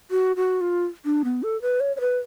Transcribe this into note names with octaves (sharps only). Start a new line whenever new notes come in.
F#4
F#4
F4
D4
B3
A4
B4
C#5
C#5
B4